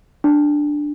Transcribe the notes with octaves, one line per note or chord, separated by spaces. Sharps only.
D4